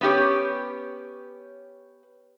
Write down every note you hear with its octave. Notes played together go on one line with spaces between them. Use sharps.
B3 C#4 F#4 G4 C#5